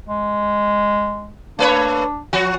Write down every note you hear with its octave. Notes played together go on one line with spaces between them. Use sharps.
G#3
A3 D4 B4 C#5
F3 F#4